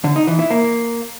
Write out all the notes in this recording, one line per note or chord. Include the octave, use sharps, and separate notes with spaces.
D3
D#4
E3
E4
A#3